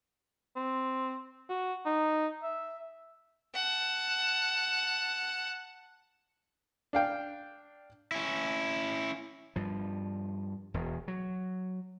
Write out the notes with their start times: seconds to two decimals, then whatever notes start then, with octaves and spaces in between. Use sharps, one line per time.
0.56 C4
1.50 F#4
1.86 D#4
2.43 E5
3.55 F#5 A5
6.93 D4 F5 G5
8.11 C#4 E4
9.56 G2 F3
10.74 E1 E2 B2
11.08 F#3